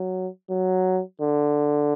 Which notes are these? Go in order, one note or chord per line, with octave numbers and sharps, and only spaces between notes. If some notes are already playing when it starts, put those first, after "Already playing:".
Already playing: F#3
F#3
D3